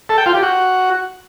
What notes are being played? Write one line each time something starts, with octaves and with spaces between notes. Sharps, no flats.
A4
G5
F4
G4
F#4